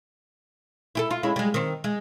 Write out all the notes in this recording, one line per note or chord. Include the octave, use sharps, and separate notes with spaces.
E4 G4 A4
F4
G#3 C#4 E4
G3 G#3
D#3 C4
G#3